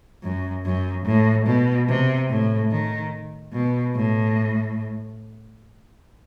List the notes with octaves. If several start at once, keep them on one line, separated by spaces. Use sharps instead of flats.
F#2
F#2
A2
B2
C3
A2
D#3
B2
A2